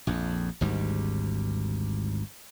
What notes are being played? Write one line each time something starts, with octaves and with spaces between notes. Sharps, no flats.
A#1 F2
G#1 D2 G#2 G3